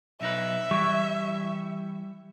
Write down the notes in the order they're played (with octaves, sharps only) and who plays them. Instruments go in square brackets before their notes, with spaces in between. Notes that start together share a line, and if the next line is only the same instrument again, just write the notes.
[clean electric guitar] B1 D#4 B4 [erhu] E5
[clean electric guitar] E3 [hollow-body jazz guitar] G3 [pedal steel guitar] C#6